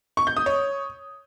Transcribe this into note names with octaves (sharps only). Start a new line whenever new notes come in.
C#6
G6
D#6
C#5